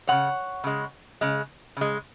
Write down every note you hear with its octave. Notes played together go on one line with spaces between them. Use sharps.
C#3 G#3 C#5 F#5
C#3 G#3
C#3 G#3
C#3 G#3